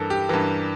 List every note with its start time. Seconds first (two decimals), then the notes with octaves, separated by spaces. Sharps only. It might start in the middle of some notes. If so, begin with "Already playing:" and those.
Already playing: G2 E3 A4 A#4
0.10 G4
0.29 G2 E3 A#4